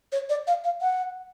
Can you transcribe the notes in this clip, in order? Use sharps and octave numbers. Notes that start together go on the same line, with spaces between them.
C#5
D5
F5
F5
F#5